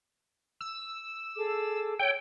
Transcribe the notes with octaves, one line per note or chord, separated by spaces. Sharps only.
E6
G#4 A4 D6
C#5 G5 E6